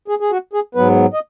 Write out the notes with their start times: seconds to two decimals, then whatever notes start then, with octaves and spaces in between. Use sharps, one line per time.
0.08 G#4
0.20 G#4
0.31 F#4
0.53 G#4
0.75 G#2 F#3 B3 B4
1.13 D#5